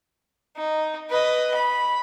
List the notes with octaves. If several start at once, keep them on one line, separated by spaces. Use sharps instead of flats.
D#4
B4 D#5
B5